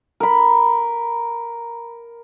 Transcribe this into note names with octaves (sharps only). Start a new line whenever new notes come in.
A#4 B5